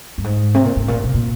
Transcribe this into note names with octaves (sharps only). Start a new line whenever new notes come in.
G2
G#2
C3
A#2
G#2
A#2
C3
A#2